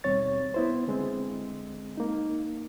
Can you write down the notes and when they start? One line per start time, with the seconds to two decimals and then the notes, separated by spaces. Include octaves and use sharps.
0.04 D#2 B2 G3 C4 C#5 A6
0.54 B3 E4 C5
0.87 D3 G#3 C4
1.97 A#3 D#4